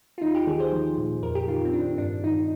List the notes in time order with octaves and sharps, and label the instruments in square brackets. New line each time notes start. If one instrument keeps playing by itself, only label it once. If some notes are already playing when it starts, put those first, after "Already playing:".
[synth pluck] F4
D#2 D#4
G4
D#3 G#4
C5
F3
A#2
F2 A#4
G4
D#3 F4
C4
D#3 D4
G2 D4
D#3 D#4